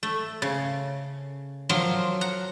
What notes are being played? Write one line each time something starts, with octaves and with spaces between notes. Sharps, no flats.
A3
C#3
F3 F#3 A#4 F5 C6
F#5 A#5